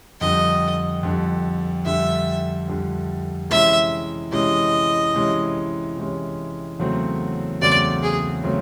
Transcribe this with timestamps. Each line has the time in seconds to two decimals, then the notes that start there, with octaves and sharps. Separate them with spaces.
0.21 F2 D3 G3 D#5
1.03 F2 D3 G3
1.85 F2 D3 G3 E5
2.68 F2 D3 G3
3.50 C3 E3 G#3 C#4 E5
4.32 C3 E3 G#3 C#4 D#5
5.14 C3 E3 G#3 C#4
5.97 C3 E3 G#3 C#4
6.79 E2 C#3 F#3 A3 C4
7.61 E2 C#3 F#3 A3 C4 D5
8.03 G#4
8.44 C#3 F#3 A3 C4